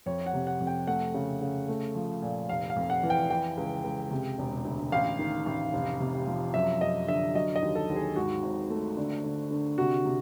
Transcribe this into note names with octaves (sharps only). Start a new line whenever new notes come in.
F2 C#5
F#5
C3
F#5
F2
G5
A3 F#5
C#3
C#3
A3
F3
A#2
F1 F5
F5
F2
F#5
E3
G5
E3 G5
C#2
C#2
C3
E1
D2
A1 F5
D#3
A1
F1
C3
F3
F#2 E5
F#2 D#5
D3 E5
F#3 D#5
D#5
D#2
A4
D#2
G#4
G#2 F#4
G#1
A3
D3
D3
D3
C3 F#4
C3